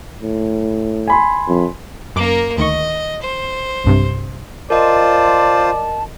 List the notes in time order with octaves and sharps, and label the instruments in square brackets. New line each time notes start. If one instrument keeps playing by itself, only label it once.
[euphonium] A2
[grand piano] G#5 B5 C6
[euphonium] F2
[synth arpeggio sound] F#2 D6 D7 [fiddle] A#3 A#4
[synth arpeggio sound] D2 D#3 C#6 [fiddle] D#5
[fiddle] C5
[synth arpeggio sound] B1 G2 C3
[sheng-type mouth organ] F4 C5 [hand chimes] A#4 D#5 [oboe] D5 [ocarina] A5